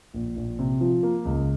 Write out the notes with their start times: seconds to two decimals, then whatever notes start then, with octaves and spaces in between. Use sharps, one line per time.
0.14 A#1
0.36 A#1
0.59 C3
0.81 F3
1.03 A#3
1.25 C#2